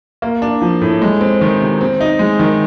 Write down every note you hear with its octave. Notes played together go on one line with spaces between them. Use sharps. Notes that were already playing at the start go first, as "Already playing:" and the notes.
A#3
D4
F3
A2
G#3
C4
D#3
C3
C4
D#4
G#3
D#3